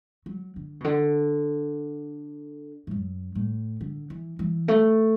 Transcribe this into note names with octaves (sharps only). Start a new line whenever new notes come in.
F#3
D3
B2
D3
A2
F#2
A2
D3
E3
E3
A3